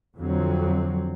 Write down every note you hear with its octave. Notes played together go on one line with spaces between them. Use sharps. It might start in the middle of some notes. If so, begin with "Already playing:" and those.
F2 D3 F#3 C4